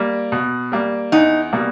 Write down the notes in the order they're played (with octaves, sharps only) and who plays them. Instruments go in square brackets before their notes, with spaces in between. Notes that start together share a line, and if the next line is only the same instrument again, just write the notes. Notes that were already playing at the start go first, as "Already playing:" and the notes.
Already playing: [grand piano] G3 A#3
B2
G3 A#3
[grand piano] E2 [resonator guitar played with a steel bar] D#4
[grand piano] B2 G3 A#3